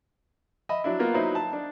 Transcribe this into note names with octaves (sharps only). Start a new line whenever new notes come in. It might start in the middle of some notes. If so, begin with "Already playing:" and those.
D#5 E5 B5
F#3 D4 E4
A#3 B3 F4 A#4
F#3 D#4 E4 B4 C5
A5
D4